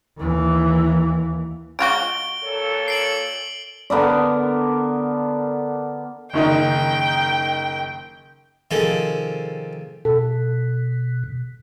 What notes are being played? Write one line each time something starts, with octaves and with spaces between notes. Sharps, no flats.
D#2 E3
G#3 F4 F#4 D7 G7
A#2 A4 C#5
C7 D7 F#7
D3 B3 A#4 D5
F#1 D#3 D#4 G5
C3 D#3 F3 G#4 A4
B2 A4